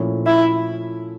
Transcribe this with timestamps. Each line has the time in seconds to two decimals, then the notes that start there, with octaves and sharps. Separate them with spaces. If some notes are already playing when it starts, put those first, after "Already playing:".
Already playing: A#2 F3 A3 C#4 E4
0.26 E4